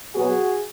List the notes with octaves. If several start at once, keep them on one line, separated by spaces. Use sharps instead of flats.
B2 F#3 B3 F#4 G#4